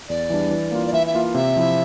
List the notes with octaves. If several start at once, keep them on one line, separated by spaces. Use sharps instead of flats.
E2 D5
E3 G3 D4
E3
A#3 F4
D5
E3 E5
E5
A#3 F4
C3 E5
F3 C4 E4 G4